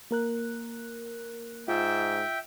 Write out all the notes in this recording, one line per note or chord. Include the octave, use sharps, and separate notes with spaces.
A#3 A#4 F#6
G#2 F4 E5 G5